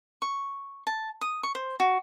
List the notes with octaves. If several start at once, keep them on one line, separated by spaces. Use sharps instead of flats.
C#6
A5
D#6
C#6
C5
F#4